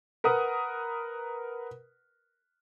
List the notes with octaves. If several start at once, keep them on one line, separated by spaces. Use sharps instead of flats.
A#4 B4 F#5 D#6